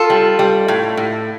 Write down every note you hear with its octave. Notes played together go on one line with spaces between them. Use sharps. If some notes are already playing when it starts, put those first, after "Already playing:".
Already playing: F4 A4
G3
G3
A2
A2